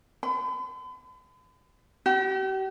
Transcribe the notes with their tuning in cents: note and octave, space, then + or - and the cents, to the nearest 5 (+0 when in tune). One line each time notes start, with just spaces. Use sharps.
B5 +45
G4 -40